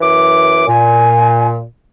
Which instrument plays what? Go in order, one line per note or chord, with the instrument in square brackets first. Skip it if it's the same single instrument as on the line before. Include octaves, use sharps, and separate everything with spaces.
[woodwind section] F#2 E3 D6
[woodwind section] A#2 [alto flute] G#5